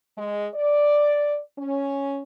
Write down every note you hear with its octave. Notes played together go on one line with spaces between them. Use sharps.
G#3
D5
C#4